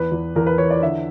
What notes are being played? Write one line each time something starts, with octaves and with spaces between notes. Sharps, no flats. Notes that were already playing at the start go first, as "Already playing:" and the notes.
Already playing: E2 B4
E2
E2 A#4
B4
E3 C#5
D5
D3 E5